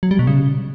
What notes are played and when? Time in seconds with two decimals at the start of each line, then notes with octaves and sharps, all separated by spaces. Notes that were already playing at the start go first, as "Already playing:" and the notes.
0.03 F#3
0.11 G3
0.19 B2
0.27 C#3